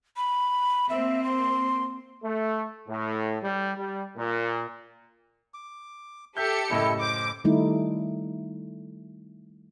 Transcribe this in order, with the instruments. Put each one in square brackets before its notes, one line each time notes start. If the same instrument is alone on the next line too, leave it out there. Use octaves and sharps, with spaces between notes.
[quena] B5
[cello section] A#3 C4 [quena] E5
[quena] C6
[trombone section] A3
A2
G3
G3
A#2
[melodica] D6
[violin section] G4 A4 C#7 [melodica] E5 [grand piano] G6
[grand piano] F#1 A2 D#5 [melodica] E4
[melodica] C5 [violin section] D6
[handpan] D#3 G3 A3 D#4 E4